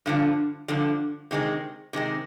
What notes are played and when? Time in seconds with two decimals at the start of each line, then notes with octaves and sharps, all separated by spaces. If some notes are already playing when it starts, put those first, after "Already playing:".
0.06 G2 D3 F3
0.68 G2 D3 F3
1.31 C3 D#3 G#3 C4
1.93 C3 D#3 G#3 C4